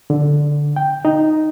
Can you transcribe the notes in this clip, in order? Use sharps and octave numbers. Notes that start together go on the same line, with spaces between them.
D3
G5
D#4